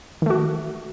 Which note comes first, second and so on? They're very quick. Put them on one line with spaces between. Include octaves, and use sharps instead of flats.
D#3 A3 F#4